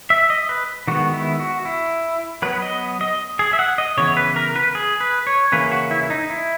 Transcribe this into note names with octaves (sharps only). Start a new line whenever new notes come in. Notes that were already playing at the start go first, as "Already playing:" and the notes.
E5
D#5
B4
D#3 G#3 B3 F#4
E4
F#4
E4
F#3 B3 B4
D#5
D#5
G#4
E5
F#5
D#5
C#3 E3 B3 C#5
B4
A#4
B4
G#4
B4
C#5
C#3 E3 A#3 C#4 B4
F#4
E4
D#4
E4